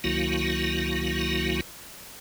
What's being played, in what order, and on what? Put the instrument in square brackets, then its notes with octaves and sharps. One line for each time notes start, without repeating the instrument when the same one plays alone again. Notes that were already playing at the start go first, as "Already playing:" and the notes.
[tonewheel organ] C#2 D#3 F#3 A#3 E4 F#4